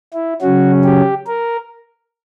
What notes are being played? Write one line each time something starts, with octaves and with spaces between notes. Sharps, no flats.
E4
C#3 F#3 C#4 F#4
G4
A#4